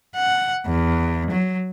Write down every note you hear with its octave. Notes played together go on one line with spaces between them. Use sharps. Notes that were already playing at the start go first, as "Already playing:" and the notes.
F#5
E2
F#3